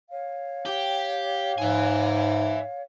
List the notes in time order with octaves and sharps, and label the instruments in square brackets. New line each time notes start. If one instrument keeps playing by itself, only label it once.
[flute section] C#5 F5
[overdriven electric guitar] G4
[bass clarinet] G#2 [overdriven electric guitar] E5 G#5